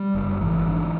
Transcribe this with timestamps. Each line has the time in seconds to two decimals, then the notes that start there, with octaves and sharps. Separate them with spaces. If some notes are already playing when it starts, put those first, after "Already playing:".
Already playing: G3
0.15 F#1
0.41 G#1 E3
0.67 D3